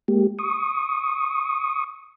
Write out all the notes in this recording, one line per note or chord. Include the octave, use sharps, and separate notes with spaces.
G#3 A#3 G4
C#6 D#6